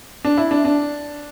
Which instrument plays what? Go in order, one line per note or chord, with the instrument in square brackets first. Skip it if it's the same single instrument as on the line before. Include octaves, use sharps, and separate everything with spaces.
[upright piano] D4
E4
D4
D4